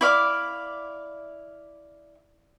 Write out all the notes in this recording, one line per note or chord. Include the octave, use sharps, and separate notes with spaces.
E4 D5 F5 D6